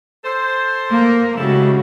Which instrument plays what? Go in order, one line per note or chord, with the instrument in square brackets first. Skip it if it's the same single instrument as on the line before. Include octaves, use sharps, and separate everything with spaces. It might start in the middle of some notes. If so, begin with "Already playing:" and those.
[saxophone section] A4 C5
[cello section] A#3 A#4
[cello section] C#3 G#3 F#4 [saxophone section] E4 G4 A4